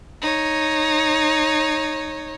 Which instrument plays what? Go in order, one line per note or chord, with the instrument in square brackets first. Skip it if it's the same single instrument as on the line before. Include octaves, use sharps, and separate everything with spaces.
[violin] D#4 C#5